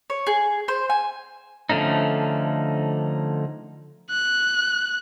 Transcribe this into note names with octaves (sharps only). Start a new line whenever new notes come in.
C#5
G#4
C5
G#5
D3 F3 A3 C#4 D#4
F#6